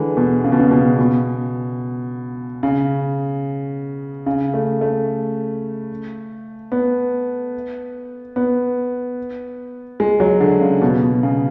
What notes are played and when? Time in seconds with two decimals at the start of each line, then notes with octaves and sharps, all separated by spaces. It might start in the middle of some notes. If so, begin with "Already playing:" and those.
Already playing: D3 E3 G#3
0.17 B2
0.44 C#3
0.52 B2
0.60 C#3
0.71 B2
0.99 B2
2.63 C#3
4.26 C#3
4.54 A3
4.81 A3
6.72 B3
8.36 B3
10.00 G#3
10.20 F#3
10.41 D3
10.61 C#3
10.82 B2
11.03 B2
11.23 C#3